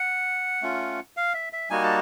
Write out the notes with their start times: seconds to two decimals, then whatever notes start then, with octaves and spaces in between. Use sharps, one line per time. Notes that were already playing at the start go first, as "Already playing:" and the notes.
Already playing: F#5
0.62 A3 C#4 F4
1.17 F5
1.34 E5
1.53 E5
1.70 G3 A#3 D#4 F#4 G#5
1.83 A5